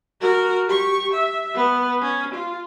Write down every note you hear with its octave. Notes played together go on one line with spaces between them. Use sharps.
F#4 A#4
G4 C#6
E5
B3
C#4
F4